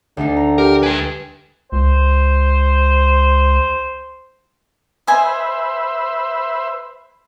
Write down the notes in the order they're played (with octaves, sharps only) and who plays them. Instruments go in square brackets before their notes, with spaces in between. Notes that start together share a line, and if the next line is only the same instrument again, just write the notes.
[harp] D2 D4 D#4 [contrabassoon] D3
[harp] A#5
[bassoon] G4 [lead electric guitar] A#4
[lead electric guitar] B4 G5 [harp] G#5
[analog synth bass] C#2 [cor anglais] C5
[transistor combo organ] B4 C5 E5 [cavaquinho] D#5 G#5